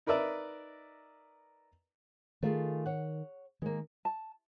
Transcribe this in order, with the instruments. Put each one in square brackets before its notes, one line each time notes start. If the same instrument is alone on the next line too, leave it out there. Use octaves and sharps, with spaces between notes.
[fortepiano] D#4 A#4 B4 D5 E5
[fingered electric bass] D#3 [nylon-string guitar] A3 F4 G#4
[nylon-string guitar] C#5 F#5
[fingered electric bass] D#3 [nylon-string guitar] G#3 A#3
[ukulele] A5